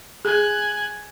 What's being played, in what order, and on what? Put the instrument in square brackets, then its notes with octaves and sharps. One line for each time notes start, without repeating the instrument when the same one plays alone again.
[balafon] G#4 [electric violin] G#5 F#6